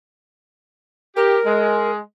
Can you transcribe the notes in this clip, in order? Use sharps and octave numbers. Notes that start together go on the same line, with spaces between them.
G4 A#4
G#3